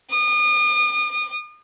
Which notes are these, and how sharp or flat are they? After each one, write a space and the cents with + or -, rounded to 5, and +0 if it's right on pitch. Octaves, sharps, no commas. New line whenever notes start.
D#6 -35